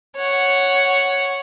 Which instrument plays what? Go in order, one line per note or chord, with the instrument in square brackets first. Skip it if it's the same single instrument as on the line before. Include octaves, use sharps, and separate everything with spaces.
[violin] C#5 F#5